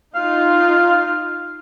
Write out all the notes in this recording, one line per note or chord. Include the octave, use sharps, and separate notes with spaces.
D#4 F4 F5